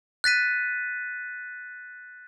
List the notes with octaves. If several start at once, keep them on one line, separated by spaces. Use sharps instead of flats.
F#6 A6 B6 D#7